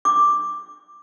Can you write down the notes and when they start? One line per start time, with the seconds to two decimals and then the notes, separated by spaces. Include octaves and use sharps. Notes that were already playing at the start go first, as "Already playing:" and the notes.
0.05 D6